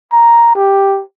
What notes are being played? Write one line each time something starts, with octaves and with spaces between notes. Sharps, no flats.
A#5
G4